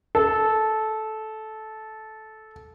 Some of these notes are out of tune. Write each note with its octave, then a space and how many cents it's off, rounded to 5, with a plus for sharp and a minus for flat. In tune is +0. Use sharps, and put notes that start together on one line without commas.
A4 -15